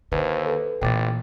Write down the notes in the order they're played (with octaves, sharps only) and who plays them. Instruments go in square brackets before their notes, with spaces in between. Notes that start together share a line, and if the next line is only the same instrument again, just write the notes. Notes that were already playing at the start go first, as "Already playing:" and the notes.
[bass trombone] D#2 [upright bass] D3 [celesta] B4 C5
[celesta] A4 B4
[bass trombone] A1 [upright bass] A#2 E3 [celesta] G5 D6 A6